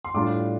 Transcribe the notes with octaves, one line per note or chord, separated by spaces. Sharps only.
C6
A2 G3 D4 F4 D6